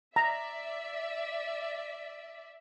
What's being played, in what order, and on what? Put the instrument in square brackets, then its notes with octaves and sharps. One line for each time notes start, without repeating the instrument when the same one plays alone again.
[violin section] D5 E5 [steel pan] A#5